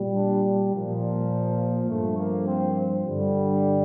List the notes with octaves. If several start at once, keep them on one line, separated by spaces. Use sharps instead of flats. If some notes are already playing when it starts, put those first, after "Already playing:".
Already playing: A#2 G3
D4
A#2 F3
G2 F3 A3
A#3
C4
G2 D3 G3